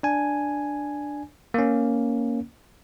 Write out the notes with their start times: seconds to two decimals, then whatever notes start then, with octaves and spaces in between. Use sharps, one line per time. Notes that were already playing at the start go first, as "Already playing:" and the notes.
0.03 D4 G#5
1.54 A#3 C#4